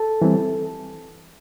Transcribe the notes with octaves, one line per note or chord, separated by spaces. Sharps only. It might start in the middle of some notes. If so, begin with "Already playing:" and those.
Already playing: A4 A5
E3 G3 C4